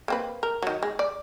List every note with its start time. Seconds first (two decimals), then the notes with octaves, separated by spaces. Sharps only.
0.08 A#3 C4 B4
0.43 A#4
0.62 D#3 F#3
0.83 G#3
0.99 D5